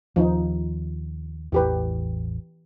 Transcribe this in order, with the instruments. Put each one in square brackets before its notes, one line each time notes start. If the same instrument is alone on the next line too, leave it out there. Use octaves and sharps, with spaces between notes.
[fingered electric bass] D#2 [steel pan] F3 D#4
[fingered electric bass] A1 E2 [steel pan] E3 G4 B4